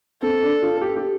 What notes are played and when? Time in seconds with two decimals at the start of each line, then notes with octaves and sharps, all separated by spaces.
0.22 C4 A4
0.42 D4
0.62 F4
0.77 A4
0.82 G4
0.96 G4